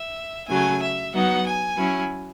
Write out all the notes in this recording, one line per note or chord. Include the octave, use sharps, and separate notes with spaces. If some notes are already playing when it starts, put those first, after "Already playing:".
Already playing: E5
C#3 F#3 A3 G#5
E5
F#3 B3 D#4 F#5
G#5
F#3 C#4 E4